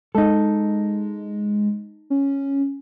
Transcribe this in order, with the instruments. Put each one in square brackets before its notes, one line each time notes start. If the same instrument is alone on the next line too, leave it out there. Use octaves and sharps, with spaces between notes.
[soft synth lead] G#3 [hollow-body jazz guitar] D#4 A4
[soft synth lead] C#4